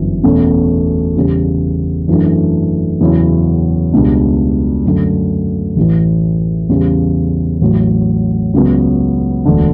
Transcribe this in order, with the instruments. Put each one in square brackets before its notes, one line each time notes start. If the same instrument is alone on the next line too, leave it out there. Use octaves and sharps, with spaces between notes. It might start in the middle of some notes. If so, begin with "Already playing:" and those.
Already playing: [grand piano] G1 F#2 E3
E2 B2 A3 C#4
E2 C#3 G3
F#2 E3 A3 D4
E2 C#3 F#3 C#4 E4
C#2 B2 G3 D4
F#2 D3 A3
A1 A2 E3
E2 C#3 G3
A1 A2 F#3
C#2 C#3 F#3 B3
E1 D2 D3